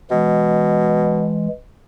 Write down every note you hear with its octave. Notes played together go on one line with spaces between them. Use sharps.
B2 E3 G#3